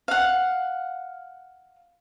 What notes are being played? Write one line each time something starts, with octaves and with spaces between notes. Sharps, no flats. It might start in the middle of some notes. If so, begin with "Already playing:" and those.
F5 F#5